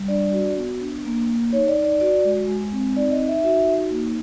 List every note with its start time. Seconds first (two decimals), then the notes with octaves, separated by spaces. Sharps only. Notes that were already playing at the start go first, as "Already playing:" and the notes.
Already playing: G3
0.08 D4 D5
0.32 F#4
0.57 B3
0.81 D4
1.05 A#3
1.28 A#3
1.53 D#4 C#5
1.68 D5
1.76 D#4
1.85 D5
2.00 F#4 D5
2.25 G#3
2.48 G#3
2.72 C4
2.96 D#4 D5
3.11 D#5
3.20 D#4
3.28 E5
3.43 F#4 E5
3.67 D#4
3.91 A#3